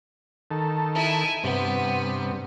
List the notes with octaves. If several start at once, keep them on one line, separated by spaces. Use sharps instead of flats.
D#3 A4
E4 G#5
G2 C3 B3